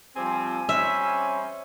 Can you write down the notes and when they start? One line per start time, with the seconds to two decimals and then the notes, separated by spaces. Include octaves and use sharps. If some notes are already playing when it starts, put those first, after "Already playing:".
0.16 F3 G3 C4 G#5
0.69 G3 C4 C#4 E5